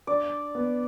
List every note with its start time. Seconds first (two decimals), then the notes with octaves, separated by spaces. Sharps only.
0.07 D4 D5
0.55 B3